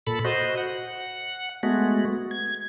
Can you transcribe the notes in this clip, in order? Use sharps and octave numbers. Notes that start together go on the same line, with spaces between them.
A#2 A4 B5
F#4 C5 D#5
F#5
G#3 A3 B3 F#4
G#6